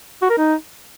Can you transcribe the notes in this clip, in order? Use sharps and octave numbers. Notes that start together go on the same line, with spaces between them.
F#4
A#4
D#4